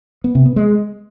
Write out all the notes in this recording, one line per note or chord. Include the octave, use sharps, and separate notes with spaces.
B3
C3
B3
G#3